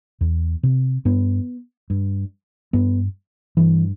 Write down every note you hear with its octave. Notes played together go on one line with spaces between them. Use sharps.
E2
C3
G2 B3
G2
G2 B3
G2 E3